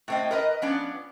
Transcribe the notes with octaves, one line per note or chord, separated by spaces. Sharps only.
A2 C4 D#5
A#4 B4 D#5
F3 B3 C#4 D4 D5